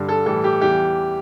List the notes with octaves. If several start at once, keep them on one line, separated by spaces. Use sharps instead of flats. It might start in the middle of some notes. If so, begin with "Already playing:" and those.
Already playing: G2 D3 G3
A4
A2 E3 G3 A4
G4
E2 E3 G3 G4